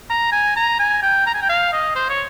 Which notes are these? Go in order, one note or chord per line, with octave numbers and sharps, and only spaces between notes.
A#5
G#5
A#5
G#5
G5
A#5
G#5
G5
F5
D#5
C5
C#5